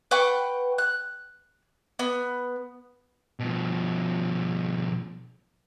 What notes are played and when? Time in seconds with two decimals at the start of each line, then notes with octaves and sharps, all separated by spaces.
0.11 B4 F#5 G5 C#6
0.78 F#6
1.99 B3
3.40 B2 F3